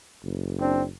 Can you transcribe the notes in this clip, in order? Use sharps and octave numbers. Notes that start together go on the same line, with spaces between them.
F#1
C4 D4